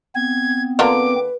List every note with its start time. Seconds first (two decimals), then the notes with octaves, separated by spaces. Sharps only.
0.15 B3 C4 G#6
0.79 D3 A#3 F4 B4 D6